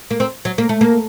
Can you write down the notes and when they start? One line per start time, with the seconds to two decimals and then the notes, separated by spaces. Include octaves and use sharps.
0.11 A#3
0.20 C4
0.45 F#3
0.58 A#3
0.69 A3
0.81 A#3